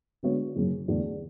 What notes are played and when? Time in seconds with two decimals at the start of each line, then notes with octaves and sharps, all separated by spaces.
0.23 D3 G#3 B3 F#4 C#5
0.56 F#1 F#2 C#3
0.88 E2 D3 A3 D4